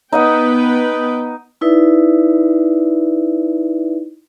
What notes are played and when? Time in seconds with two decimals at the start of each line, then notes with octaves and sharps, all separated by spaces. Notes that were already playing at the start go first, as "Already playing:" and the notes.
0.12 B3 D#4 B4 D#5 F#5 G5
1.61 D#4 E4 B4 D5 E5